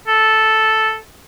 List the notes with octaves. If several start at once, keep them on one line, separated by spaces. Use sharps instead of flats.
A4